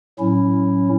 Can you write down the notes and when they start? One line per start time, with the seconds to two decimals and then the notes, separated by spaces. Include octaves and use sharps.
0.19 A2 F#3 C#4 E4